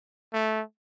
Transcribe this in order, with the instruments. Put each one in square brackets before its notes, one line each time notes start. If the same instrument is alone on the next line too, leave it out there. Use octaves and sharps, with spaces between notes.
[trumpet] A3